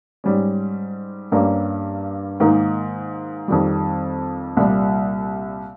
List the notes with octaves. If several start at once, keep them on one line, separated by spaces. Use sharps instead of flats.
G#2 G3 C#4
G2 G3 A#3 C#4
G#2 D#3 A#3 D#4
F2 D#3 G3
C2 A#2 G3